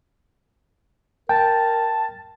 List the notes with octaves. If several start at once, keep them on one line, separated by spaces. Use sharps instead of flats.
A#4 G5 A5